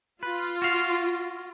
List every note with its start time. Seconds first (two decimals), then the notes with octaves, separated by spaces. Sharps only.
0.23 F4 B4
0.62 F#4 F5